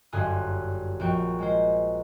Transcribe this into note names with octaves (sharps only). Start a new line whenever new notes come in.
G1 F#2 G#5 C6 D#6 F#6
A#1 F#4 G5 C#6
G#3 A#3 C5